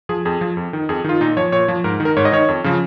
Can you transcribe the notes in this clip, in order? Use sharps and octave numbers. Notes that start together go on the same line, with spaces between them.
F3 G#4
F2 G#4
F3
F2
D#3
F2 G#4
D#3 F4
A#2 D#4
F3 C#5
A#2 C#5
F3
G#2 A#4
D#3
A#4
G#2 C#5
D#5
D#3 C#5
F2
C#3 F3